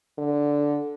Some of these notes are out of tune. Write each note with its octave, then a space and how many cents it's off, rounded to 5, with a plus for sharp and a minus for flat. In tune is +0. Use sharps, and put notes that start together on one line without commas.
D3 -5